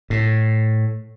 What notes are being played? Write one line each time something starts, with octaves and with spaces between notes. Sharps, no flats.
A2